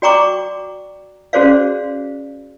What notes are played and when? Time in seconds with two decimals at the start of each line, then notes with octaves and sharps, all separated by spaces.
0.02 F#4 D5 G5 A#5 C#6 D6
1.33 C#4 F#4 G#4 C5 D5 F5